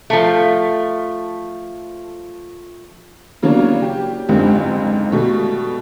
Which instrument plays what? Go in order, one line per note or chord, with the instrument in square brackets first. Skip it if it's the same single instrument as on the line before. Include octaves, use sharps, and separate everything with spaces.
[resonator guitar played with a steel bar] F3 A3
[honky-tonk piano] C#3 F#3 A#3 B3 D4 C#5
G4
F#1 C#2 G#2 D3 G3 C4
B2 G3 A3